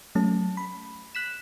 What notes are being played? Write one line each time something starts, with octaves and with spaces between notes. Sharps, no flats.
F#3 A3 C#4 A5
B5
F#6 B6 E7